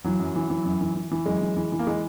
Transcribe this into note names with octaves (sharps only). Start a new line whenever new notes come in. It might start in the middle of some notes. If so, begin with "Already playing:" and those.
E3 F#3
F#2
E3
E3
F#2
E3
E3
E3
F#2 G#3
E3
E3
E3
A#3
E3 G#3